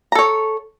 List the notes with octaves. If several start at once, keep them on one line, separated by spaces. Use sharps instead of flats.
A4 C#5 A#5